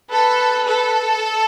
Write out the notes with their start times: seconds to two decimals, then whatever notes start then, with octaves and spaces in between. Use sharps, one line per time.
0.11 A4 B4
0.65 A4